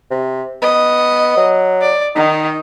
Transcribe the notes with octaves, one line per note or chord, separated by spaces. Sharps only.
C3
B3 D#5
F#3
D5
D#3 D#4